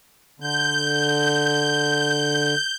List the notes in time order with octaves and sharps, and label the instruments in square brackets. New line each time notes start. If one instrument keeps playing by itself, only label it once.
[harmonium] D3 [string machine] G6